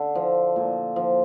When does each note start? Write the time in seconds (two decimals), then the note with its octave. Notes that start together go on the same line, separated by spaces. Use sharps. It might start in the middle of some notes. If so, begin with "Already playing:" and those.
Already playing: D3
0.15 F3
0.56 A#2
0.96 F3